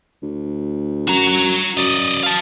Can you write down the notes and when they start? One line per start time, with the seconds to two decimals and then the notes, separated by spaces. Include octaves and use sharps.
0.22 D2
1.08 F#2 F#4 A#5
1.77 F#2 D5 D#5
2.23 F5 A5